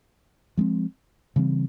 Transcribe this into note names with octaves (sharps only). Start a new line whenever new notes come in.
F3 G#3 C4
C#3 E3 G3 C4